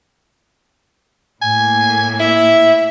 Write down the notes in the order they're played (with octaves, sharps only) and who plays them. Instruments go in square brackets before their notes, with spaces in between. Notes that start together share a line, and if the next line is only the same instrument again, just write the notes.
[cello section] A2 A#3 [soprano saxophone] G#5
[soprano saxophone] E4 [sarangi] E5